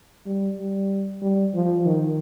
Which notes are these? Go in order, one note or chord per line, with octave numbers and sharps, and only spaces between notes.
G3
G3
G3
F3
D#3